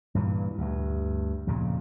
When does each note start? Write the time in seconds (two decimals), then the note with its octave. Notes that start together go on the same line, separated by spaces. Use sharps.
0.15 G2 A#2 C#3 E3
0.58 D2 G2
1.47 F2 A#2 C#3